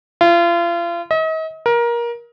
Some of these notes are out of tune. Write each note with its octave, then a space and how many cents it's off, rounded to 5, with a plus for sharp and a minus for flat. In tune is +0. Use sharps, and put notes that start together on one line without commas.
F4 -35
D#5 +40
A#4 +20